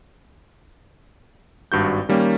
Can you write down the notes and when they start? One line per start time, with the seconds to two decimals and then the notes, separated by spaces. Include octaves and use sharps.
1.72 G#1 G2 F#4 G6
2.09 D#3 G3 A#3 C#4